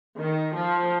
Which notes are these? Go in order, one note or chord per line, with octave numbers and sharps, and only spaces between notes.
D#3
F3